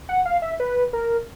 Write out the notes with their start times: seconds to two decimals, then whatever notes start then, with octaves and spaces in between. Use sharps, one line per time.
0.09 F#5
0.25 F5
0.42 E5
0.60 B4
0.93 A#4